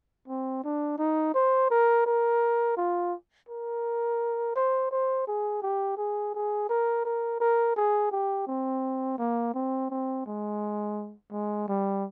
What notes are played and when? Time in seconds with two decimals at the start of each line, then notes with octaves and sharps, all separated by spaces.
0.28 C4
0.64 D4
0.98 D#4
1.34 C5
1.70 A#4
2.06 A#4
2.77 F4
3.49 A#4
4.55 C5
4.91 C5
5.27 G#4
5.62 G4
5.97 G#4
6.34 G#4
6.69 A#4
7.05 A#4
7.40 A#4
7.76 G#4
8.12 G4
8.47 C4
9.18 A#3
9.54 C4
9.90 C4
10.26 G#3
11.32 G#3
11.68 G3